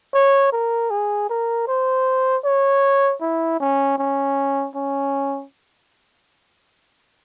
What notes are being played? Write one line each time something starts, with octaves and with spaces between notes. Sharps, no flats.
C#5
A#4
G#4
A#4
C5
C#5
E4
C#4
C#4
C#4